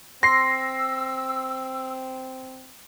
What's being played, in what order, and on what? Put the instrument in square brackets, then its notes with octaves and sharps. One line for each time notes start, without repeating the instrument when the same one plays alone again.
[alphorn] C4 [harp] C6 [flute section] E6 [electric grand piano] A#6 C7